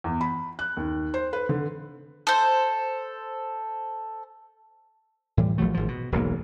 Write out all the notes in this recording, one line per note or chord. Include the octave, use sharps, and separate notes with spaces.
E2
B5
F#6
D#2
C5
B4
D3
A4 C5
A2 E3 G3
A#1 F3 F#3 A3
G#1 F3
B2
E1 B1 G#2 A#3